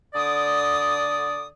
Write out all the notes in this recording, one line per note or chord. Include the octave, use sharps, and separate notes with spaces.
D3 D5 D#6